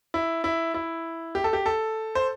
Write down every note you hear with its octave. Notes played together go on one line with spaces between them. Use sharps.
E4
E4
E4
G4
A4
G4
A4
C5